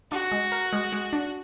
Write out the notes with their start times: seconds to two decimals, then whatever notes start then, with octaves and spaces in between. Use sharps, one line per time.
0.12 D4 F#4
0.32 G#3
0.52 A#4
0.73 G#3
0.93 G#3
1.13 D4